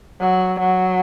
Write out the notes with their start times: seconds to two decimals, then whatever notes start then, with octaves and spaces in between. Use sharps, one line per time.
0.21 F#3
0.60 F#3